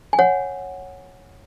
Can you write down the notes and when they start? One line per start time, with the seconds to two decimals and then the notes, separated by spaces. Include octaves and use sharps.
0.13 G#5
0.19 C#5 F#5